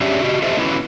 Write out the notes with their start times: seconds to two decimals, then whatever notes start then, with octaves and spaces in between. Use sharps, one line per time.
0.01 C#4 D4 G4 G#4 C#5 E5
0.22 F#4 G4 D#5
0.42 F4 G4 A4 C5 D#5 E5
0.57 B3 C#4 E4 F#4 B4